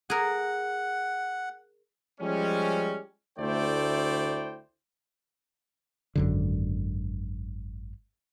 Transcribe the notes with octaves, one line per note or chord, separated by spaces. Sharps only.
G#4 A#4 F#5
F3 G3 G#3 C#4
D2 A3 E4 C5 D5 G5
G#1 F#2 D3